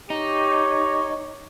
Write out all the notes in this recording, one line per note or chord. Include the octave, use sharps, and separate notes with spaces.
D#4 G4 C#5